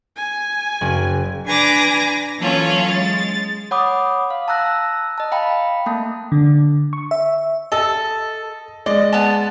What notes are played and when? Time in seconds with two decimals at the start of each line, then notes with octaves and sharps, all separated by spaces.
0.17 G#5
0.81 F#1
1.46 D4 B4 G#5 A#5 D6 A#6
2.38 E3 F#3 A#3 C#4 F4 A4
2.90 G#3 A6
3.71 C#5 F#5 B5 D6 D#6
4.30 F5
4.48 A5 A#5 E6 F#6 A#6
5.18 D#5 A5
5.32 F5 G5 A#5 B5
5.86 A3 A#3 A5
6.32 D3
6.93 C#6
7.11 E5
7.72 A4 D#5
8.86 G#3 D5 D#5
9.13 B3 A5